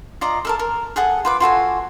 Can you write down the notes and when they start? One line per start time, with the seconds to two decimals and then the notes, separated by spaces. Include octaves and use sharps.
0.21 F4 D5 D#5 A#5
0.45 A4 A#4 A5
0.59 A#4
0.96 G#4 A4 F#5 D#6
1.25 F4 B4 D6
1.40 F4 F#4 A4 G#5